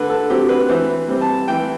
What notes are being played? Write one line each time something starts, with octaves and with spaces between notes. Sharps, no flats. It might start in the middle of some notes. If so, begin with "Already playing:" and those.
Already playing: D3 B4
A4
F#3 C4 G4
B4
E3 C5
G3 C4
A5
E3 G5